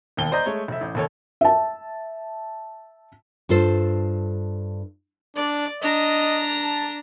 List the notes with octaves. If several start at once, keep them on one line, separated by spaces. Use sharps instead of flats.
E1 D#2 G7
C5 D5 D#5 A#5 G6
G#3 A3 C#5
F1 E5
A1
F1 D#2 A4 C#5
E5 A5
G2 F4 A4 C5
D4 D5
D4 D#5 A#5
A5